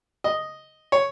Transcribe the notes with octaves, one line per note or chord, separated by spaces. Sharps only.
D#5
C#5